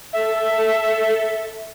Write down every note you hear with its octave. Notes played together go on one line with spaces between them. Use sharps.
A4 E5